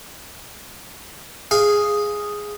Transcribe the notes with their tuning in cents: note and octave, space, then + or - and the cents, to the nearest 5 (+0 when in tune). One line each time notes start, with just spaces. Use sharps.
G#4 -5 F5 +0